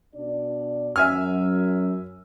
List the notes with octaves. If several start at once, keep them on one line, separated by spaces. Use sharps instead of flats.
B2 D4 D5
F#2 E5 G#5 F6